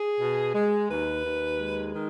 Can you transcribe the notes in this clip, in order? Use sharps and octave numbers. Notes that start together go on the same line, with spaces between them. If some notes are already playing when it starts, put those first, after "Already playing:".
Already playing: G#4
B2
G#3
D#2 B4
D#2
G#3
D#3